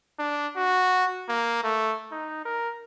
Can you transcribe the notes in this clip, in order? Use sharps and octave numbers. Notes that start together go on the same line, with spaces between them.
D4
F#4
A#3
A3
D#4
A#4